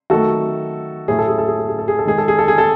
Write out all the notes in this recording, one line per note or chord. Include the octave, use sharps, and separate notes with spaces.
D#3 F#3 A3 F#4 A4
A2 F#3 A3 G#4
A4
G#4
A4
G#4
A4
G#4
A4
G#4
A4
D#3 G#3 G#4
A4
G#4
A4
G#4
A4